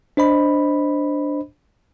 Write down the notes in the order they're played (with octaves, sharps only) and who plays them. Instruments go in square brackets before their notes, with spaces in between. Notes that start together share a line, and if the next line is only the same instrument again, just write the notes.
[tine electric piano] D4 C5 D#5 B5